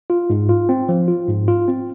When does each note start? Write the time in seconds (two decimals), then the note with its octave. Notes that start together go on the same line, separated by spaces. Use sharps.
0.10 F4
0.30 G#2
0.49 F4
0.69 C4
0.89 F3
1.08 F4
1.28 G#2
1.48 F4
1.68 C4